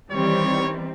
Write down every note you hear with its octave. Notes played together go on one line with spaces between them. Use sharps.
D#3 E3 G3 C4 C#5